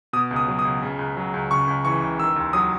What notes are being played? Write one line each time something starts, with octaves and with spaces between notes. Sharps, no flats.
B2 D#6
C#2
D#6
F#3
D#6
C#2
C#3
C#2
F#3
C#2
C#3 C#6
C#2
E3 C#6
C#2
D#3 E6
D#2
F#3 D#6